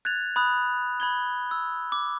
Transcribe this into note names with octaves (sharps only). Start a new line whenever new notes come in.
F#6 G#6 A6 F7
B5 D#6 F#6 F7
B5 G#6 G7
E6
D6